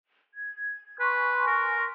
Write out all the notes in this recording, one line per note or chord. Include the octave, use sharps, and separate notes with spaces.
G#6
B4 G#5 C6 C#6
A#4